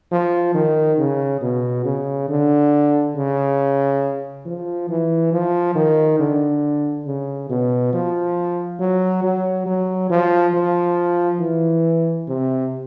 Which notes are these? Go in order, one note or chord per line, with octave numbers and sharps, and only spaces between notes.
F3
D#3
C#3
B2
C#3
D3
C#3
F3
E3
F3
D#3
D3
C#3
B2
F3
F#3
F#3
F#3
F3
F3
E3
C3